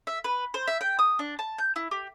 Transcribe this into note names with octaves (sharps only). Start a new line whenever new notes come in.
E5
B4
C5
E5
G5
D#6
D4
A5
G6
E4
G4